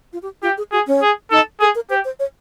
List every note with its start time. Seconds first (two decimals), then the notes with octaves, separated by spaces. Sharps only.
0.13 F4
0.23 G4
0.42 F4 G4
0.57 G#4
0.72 F#4 G#4
0.87 C#4
1.02 G#4
1.31 D#4 A4
1.60 G#4 A4
1.75 A#4
1.90 G4 C5
2.05 C5
2.20 C#5